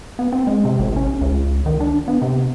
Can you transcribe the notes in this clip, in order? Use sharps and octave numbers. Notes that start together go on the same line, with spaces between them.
B3
C4
G#3
C3
A1
C#4
C#2
D#3
D4
B3
C3